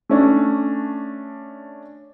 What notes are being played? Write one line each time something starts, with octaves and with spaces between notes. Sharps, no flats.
A3 C#4 D4